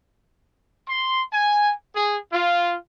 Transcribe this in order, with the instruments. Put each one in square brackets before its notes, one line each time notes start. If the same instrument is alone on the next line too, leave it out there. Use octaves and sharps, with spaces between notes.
[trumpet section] C6
G#5
G#4
F4